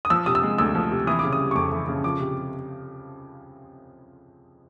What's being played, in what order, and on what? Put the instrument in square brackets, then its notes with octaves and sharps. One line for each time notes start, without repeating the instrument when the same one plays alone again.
[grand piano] D#6
F3 E6
C3 D#6
E6
G#3
D2 E6
F3
C3
E3 D#6
C#3 D6
D#6
G3
C#6
F2 D6
E3
C#3
F3 D6
C3